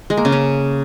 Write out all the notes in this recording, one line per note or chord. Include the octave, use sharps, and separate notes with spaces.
G#3
A#3
C#3
C#4